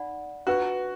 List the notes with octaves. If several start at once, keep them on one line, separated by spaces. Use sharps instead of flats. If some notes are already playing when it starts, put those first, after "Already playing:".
Already playing: D#4 D5 F#5 B5
D4 F4 F#4 B4